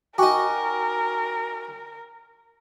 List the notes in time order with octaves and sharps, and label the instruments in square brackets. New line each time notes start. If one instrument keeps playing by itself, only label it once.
[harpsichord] D#4 F#4 [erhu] A#4 [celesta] G5 G#5 D6